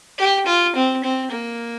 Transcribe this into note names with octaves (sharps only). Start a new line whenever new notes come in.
G4
F4
C4
C4
A#3